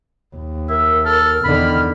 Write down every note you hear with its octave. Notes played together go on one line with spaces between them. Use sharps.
D#2
A#4 E5
A4 F6
E2 D3 D#3 B5